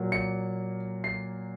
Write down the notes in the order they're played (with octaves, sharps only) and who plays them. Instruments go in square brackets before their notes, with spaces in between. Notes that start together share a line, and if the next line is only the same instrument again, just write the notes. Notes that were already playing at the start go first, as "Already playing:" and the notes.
Already playing: [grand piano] A#2 F#3 A#3
C#7
C7